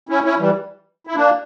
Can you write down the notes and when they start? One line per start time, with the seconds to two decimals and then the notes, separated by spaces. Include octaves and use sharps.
0.09 C#4 E4
0.24 C#4 E4
0.39 E3 G3
1.07 E4
1.16 A#3 D4